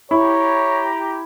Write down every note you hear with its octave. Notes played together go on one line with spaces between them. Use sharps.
E4 G4 C#5 A#5